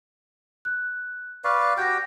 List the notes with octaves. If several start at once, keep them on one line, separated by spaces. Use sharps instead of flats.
F#6
B4 D5 F5 C#6
F#4 G4 G5 G6 A#6